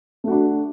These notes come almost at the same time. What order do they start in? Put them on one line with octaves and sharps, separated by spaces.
A3 F#4 D4